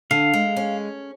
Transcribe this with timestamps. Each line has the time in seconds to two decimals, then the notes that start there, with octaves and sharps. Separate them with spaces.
0.11 D3 F5
0.34 G#3
0.56 C#4